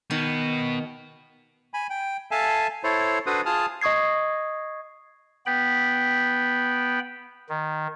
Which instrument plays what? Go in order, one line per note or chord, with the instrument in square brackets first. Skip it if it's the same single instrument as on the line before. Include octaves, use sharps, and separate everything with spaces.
[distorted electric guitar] B2 B3 [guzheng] D#3
[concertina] G#5 B5
G5
A4 E5 F5 G#5 A5
E4 A4 C5 C#5
D4 F#4 A4 B4 C5 D#6
F4 G#4 A5 D#6 F6
[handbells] D#5 C#6 D#6 G#6 C7
[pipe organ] B3 G5 B5
D#3